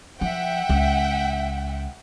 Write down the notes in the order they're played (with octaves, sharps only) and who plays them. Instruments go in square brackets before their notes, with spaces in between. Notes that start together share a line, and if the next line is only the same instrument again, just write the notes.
[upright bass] F3 [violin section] E5 F#5 G5
[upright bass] C#2